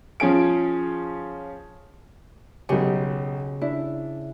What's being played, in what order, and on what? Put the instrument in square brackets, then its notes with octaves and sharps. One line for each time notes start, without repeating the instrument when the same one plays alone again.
[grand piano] F3 C#4 G#4 D7
[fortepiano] B1 G4 [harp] C#3
[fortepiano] D4 [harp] E4